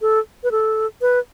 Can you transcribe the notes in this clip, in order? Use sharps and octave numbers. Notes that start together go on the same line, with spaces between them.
A4
B4
A4
B4